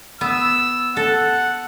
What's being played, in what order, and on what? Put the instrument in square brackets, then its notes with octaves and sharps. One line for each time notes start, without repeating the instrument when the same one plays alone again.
[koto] B3 [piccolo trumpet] E6
[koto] A4 [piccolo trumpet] F#5